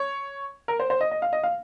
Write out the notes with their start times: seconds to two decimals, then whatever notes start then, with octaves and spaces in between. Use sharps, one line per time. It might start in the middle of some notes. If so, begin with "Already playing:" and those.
Already playing: C#5
0.68 A#4
0.80 C5
0.90 C5
1.01 D#5
1.11 D#5
1.22 F5
1.33 D#5
1.43 F5